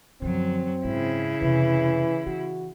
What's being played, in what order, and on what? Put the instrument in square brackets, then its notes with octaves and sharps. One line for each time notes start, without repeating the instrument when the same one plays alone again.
[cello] F#2 F#3 [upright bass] D3 F3 [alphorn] C4
[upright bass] G#2 [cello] C#3 E4
[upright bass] F2 C3 [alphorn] E3
[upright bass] E3 [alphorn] F#4